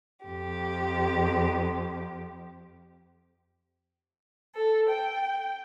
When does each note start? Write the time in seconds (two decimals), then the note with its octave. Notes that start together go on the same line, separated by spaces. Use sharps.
0.25 F2 G4
4.55 A4
4.89 G5